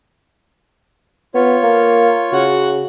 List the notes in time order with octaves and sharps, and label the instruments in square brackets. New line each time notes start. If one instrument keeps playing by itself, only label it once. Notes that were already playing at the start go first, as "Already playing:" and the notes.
[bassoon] B3 [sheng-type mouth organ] F4 C#5
[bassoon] A#3
[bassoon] C#3 [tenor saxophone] F#4